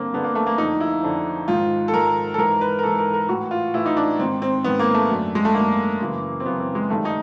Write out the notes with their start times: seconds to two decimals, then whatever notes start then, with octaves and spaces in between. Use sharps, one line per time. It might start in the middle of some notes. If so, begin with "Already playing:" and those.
Already playing: G2 D3 A#3 C4
0.12 G2 D3 B3
0.24 A#3
0.35 A3
0.47 A#3
0.58 F2 D3 D#4
0.80 E4
1.03 F2 D3
1.48 G#2 D#3 F4
1.88 A4
1.93 G#2 D#3 A#4
2.34 A4
2.38 G#2 E3 A#4
2.61 B4
2.79 A#4
2.83 G#2 E3 A4
2.99 A#4
3.14 A#4
3.29 A2 E3 F#4
3.51 F4
3.74 A2 E3 E4
3.86 D#4
3.97 D4
4.19 G#2 D#3 C4
4.42 C4
4.64 G#2 D#3 B3
4.79 A#3
4.94 A3
5.10 F#2 D3
5.35 G#3
5.45 A3
5.54 F#2 D3 A#3
6.00 F#2 C#3 E3
6.40 C4
6.45 F#2 C#3 E3 B3
6.60 C4
6.75 G#3
6.90 G2 D#3 A3
7.05 D#4